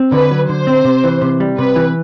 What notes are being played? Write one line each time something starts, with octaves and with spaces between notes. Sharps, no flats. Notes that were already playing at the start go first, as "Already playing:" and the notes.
Already playing: C4
D3 B4
F#3
D3 C5
C4
C3
E3
C3
G3
C3 B4
E3